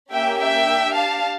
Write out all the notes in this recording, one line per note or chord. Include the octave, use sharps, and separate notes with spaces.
A#3 C#4 G4 E5 G5
E5 G5
D4 G4
F5 A5